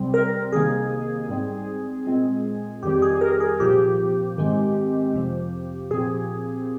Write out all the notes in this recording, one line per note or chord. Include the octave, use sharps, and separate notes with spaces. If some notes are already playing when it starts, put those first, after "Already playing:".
Already playing: C2 C3 G3 C4
A#4
C2 C3 D#3 A#3 G#4
G#2 G3 C4
A#2 G#3 C4
F2 D#3 G3 C4 G4
G#4
A#4
G#4
C2 A#2 F3 G4
G#2 D#3 G#3 C4
F2 C3 F3
A#2 F3 C4 G#4